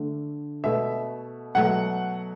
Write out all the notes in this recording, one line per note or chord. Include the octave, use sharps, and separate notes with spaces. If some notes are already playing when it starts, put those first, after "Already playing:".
Already playing: D3 A3
B2 A3 E5
B2 F#3 A3 F#5